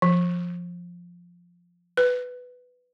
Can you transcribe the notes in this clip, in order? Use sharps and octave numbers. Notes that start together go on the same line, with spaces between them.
F3
B4